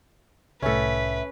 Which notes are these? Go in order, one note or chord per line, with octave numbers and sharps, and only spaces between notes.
C2 A2 C#4 A4 B4 E5